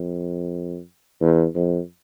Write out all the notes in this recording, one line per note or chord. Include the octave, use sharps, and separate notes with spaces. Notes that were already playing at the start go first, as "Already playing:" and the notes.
Already playing: F2
E2
F2